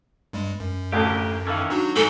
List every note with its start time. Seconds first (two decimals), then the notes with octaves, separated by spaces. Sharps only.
0.33 G2 G3 G#3
0.60 F#2
0.92 A1 D2 A#3 G4
1.47 D#3 E3 C#4 A4 F5
1.70 F#3 D4 D#4 F#4
1.96 G#2 D#4 A4 C#6